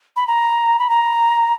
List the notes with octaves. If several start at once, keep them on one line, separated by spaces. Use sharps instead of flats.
B5
A#5
B5
A#5